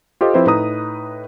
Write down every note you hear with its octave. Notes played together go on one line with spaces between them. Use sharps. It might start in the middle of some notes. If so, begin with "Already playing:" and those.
F4 G4 A4 C5 D#5
F3 C4 E4 G4 B4 C5
A2 D#4 B4 A#5 D#6